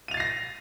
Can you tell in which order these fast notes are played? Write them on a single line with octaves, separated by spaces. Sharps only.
D#7 F7 A6 C7 A#6